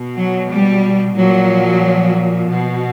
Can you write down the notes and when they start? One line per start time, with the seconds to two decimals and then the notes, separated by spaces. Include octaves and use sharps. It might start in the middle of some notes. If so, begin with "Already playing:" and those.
Already playing: B2
0.16 F#3
0.50 G3
1.16 A#2 F3 F#3
2.49 B2